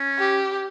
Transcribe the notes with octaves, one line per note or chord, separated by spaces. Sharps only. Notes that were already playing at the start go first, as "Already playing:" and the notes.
Already playing: C#4
G4